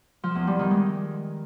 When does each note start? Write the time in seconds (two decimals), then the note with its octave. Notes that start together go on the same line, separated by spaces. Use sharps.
0.23 F3
0.35 E2
0.47 G3
0.59 D#3
0.71 G#3